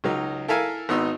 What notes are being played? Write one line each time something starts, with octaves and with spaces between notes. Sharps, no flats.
C#2 F#3 D#4
E4 A4 A#4 E5 F5 G#5
G#1 B3 D#4 C6 E6